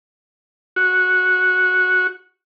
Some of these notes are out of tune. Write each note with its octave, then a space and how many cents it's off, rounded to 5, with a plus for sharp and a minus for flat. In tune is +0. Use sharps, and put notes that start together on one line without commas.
F#4 -10